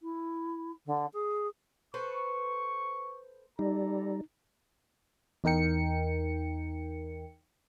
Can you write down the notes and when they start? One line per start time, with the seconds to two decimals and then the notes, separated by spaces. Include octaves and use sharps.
0.01 E4
0.86 D3
1.13 G#4
1.94 A4 B4 C5 C#6
3.59 G3 D#4 A4 A#5
5.44 E2 D#4 A#4 G5 C#7